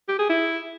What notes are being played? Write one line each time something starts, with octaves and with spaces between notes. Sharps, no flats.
G4
G#4
E4